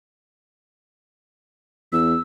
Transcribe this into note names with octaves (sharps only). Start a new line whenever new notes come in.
E2 E6